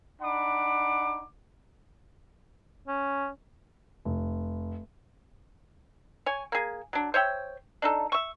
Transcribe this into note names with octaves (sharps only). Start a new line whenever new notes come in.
D4 D#4 F#5 B5 D6
C#4
F1
C#5 G#5
A#3 G#4
F#3 D4
C5 C#5 E5 G5
D4 D#4 A4
E5 C#6